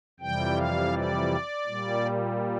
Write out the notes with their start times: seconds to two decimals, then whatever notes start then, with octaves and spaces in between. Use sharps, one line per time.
0.20 F2 C3 E3 G3 G5
0.56 F5
0.92 D5
1.66 A#2 G3